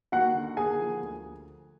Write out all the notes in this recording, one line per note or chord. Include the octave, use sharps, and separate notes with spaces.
D#2 F#4 F#5
D3
D#2 G#4 G#5
F3
D2